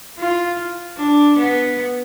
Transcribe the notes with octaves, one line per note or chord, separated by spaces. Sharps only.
F4
D4
B3